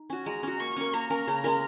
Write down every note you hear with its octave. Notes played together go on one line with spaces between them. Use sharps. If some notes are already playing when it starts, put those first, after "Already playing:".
Already playing: D#4
C#4 F#4
G#3 A#5
C#4 F#4
A#3 C#6
C#4 A#4
A#3 A#5
C#4 A#4
C#3
G#3 C#4 A#4